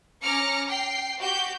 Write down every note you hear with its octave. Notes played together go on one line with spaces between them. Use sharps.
C#4 A#5 D6 F6 C#7
G5 C7
F#4 G4 G6